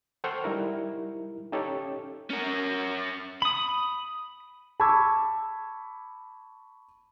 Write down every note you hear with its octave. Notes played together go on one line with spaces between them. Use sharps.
A4 C5 F#5 G5 C#6 F6
G3 D#4 E4 A#4
C#4 D#4 G4 A4 C#5
C#4 A#4
B5 D#6
A5 B5 C#6 D6 E6 G#6